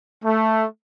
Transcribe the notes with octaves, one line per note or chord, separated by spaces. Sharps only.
A3